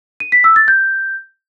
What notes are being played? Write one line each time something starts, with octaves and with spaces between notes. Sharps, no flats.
D#7
B6
E6
A6
G6